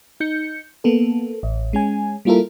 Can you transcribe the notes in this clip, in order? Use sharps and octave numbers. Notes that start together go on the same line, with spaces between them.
D#4 G6 C#7
A#3 B3 A4
A1
G#3 C#4 G#5
G3 A#3 E4 F4 A4 A#4